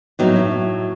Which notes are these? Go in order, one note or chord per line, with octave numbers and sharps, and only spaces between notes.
A2 F#3 B3 D#4
E4